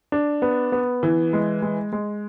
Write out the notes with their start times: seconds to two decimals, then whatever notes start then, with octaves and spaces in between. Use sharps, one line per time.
0.12 D4
0.42 B3
0.72 B3
1.03 E3
1.33 G#3
1.62 G#3
1.93 G#3